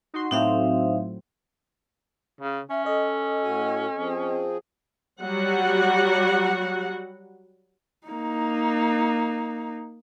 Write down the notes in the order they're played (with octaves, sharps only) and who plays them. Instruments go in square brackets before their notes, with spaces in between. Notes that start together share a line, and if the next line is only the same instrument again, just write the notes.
[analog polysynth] D#4 F#4 C6
[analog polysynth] A2 F#3 C4 [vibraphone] D#4 E5 F5
[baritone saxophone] C#3
[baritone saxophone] C#4 [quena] E5
[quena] A4 [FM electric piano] D#5
[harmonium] A2 F#4 G#5
F3 C4 G#4
[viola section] F#3 G3 F#4 F#5
[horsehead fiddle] A#3 D#4